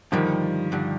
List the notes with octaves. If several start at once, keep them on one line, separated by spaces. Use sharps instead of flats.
G2 D3 D#3 F3 G3
G2 D3 G3